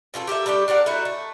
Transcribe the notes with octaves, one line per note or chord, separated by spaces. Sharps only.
B2 F4 G#4 A4
G4 A4 A#4 E5
G3 A3 D4 G4
D4 A#4 D5 F#5
A3 D#4 E4 F#4
A3